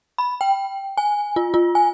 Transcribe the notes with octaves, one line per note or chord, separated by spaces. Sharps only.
B5
G5
G#5
F4
F4
G#5